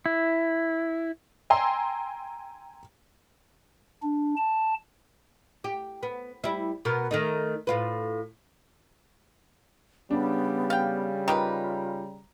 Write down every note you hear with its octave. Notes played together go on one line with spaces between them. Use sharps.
E4
G5 G#5 A#5 C6 E6
D4
A5
G4
B3
G3 E4
B2 B3 A#4
D#3 A3 D#4
A2 F4 B4
C#3 G3 B3 D4
F5 G5
D#3 F4 G4 B4 A#5